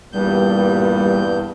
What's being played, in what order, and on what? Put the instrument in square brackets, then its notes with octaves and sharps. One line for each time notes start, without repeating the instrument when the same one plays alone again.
[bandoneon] E2 G2 G6 [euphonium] A#2 [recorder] G3